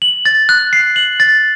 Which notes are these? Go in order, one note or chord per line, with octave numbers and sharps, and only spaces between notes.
F#7
A6
F#6
C7
F#7
A6